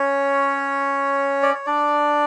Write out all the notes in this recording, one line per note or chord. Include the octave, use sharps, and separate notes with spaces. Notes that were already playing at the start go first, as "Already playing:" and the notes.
Already playing: C#4 C#5
D5
C#5
D4 D5